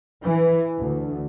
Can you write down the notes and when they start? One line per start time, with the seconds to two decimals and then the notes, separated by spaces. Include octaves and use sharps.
0.23 E3
0.78 D2